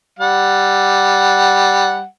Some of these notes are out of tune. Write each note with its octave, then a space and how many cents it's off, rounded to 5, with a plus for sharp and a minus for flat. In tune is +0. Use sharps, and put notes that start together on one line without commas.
G3 +0 F#5 +0